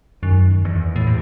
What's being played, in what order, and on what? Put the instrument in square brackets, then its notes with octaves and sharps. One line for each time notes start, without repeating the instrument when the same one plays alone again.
[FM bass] F#2 [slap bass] D#3
[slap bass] E2
[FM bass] A2
[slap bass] C3